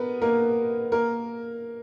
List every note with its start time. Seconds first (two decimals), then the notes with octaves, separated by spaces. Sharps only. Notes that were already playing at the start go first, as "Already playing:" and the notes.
Already playing: B3 A#4 B4
0.22 A#3 A#4
0.92 A#3 A#4